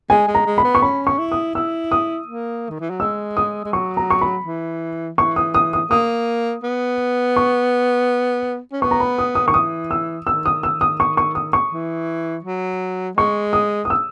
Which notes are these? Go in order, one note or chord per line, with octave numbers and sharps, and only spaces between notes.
G#3 G#5
G#3
A#5
G#3
B5
B3
C#6
C#4 B5
C#6
E4
D#6
E4 E6
D#6
A#3
D#3
E3
F#3
G#3 E6
D#6
G#3
F#3 C#6
A#5
C#6
B5
E3
E3 C#6
D#6
D#6
D#6
A#3 D#6
B3
C#6
C#4
B3 C#6
A#5
B5
D#6
D#6
D#3 C#6
E3 D#6
E6
D#3 E6
D#6
E6
D#6
C#6
C#6
D#6
C#6
E3
F#3
G#3 C#6
D#6
D#6
E6